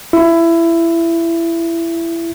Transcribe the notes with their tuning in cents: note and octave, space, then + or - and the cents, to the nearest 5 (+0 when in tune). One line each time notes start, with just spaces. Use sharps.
E4 +20